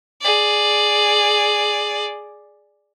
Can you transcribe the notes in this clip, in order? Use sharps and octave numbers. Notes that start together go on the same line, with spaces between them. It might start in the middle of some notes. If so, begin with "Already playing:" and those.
G#4 D5